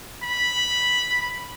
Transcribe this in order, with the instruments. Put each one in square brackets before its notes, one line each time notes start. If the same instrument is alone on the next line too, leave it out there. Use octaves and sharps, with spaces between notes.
[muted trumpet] B5